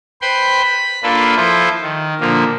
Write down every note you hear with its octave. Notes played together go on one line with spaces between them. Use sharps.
B4 C5 G5 B5 C6
B5
A#3 D4 F4 A4 B4
F3 E4 F4 A4 C5
D#3
A#2 D3 F3 A#3